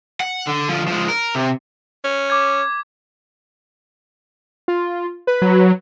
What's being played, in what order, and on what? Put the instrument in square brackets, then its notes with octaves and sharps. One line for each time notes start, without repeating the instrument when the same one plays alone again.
[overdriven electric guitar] F#5
D3
D3 F3
F3 G#3
A#4
C3
[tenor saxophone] C#4
[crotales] D6 G#6
[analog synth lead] F4
B4
[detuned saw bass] F#3